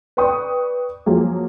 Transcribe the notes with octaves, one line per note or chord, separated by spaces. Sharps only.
B4 D5 G5 C#6 D#6
F3 F#3 A#3 G#4